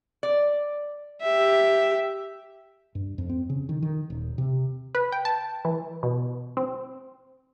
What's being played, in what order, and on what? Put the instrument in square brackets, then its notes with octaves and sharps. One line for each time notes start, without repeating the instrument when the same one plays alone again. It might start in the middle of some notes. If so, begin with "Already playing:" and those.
[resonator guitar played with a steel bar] D5
[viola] G4 E5
[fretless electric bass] G2
F2
C4
C#3
D#3
D#3
D#1
C3
[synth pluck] B4
G5
A5
E3
B2
C4